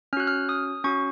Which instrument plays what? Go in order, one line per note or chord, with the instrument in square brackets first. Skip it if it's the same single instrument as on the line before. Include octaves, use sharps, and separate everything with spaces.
[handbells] C#4 F6
F#4 F#6
F6
D#6
C#4 F#4 C#6